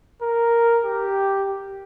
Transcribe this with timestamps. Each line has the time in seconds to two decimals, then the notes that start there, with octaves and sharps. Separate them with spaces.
0.22 A#4
0.84 G4